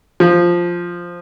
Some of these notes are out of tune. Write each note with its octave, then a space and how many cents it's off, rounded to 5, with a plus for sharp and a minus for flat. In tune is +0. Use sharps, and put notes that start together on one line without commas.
F3 +0